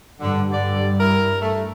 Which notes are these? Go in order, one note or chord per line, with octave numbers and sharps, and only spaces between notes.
G2 D3 G3
D3 D5
E4 A#4
A3